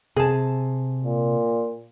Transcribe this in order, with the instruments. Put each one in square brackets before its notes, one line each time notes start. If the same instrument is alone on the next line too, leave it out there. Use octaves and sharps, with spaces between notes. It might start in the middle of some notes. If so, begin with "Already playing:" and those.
[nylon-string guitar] C3 A5 [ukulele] G#4
[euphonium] A#2